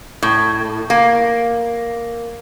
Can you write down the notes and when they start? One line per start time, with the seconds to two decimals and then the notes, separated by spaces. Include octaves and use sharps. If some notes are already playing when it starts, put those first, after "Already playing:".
0.23 A2
0.90 A#3